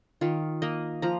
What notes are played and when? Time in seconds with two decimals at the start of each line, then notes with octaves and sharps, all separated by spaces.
0.21 D#3 F4
0.62 A#3 D#5
1.02 F3 A#5